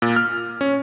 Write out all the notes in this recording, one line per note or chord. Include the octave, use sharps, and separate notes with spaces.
A#2
F6
C#4